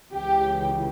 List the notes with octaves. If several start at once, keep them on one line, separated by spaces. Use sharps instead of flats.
C#2 C#3 E3 G4